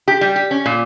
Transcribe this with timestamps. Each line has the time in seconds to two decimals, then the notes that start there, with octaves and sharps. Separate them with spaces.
0.08 G4
0.21 G3
0.36 G4
0.51 C#4
0.66 A#2